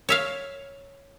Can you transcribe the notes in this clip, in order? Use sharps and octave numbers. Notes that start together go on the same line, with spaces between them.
C#5 E5 F5